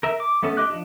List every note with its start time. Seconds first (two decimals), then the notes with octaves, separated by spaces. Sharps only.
0.03 A#4 E5
0.20 D6
0.43 A3 B3 C#4 A4
0.57 G4 D#5 D6 F#6
0.70 F3 D4